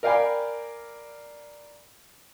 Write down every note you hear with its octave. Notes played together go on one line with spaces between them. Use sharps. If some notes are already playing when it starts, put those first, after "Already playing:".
A#4 D5 F5 G5 G#5 B5